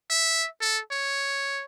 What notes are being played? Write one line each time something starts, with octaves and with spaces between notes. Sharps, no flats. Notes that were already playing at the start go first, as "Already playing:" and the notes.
E5
A4
C#5